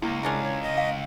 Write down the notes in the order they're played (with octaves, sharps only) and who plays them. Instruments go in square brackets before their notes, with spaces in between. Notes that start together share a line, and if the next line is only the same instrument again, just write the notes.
[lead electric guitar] C#2 [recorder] A#3 [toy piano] E4
[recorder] G#3 [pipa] C#4 D4 A#4
[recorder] C#5
D#5
[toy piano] F5